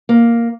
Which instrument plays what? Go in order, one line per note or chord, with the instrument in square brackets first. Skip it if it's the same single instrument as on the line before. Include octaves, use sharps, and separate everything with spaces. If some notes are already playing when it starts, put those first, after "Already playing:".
[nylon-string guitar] A#3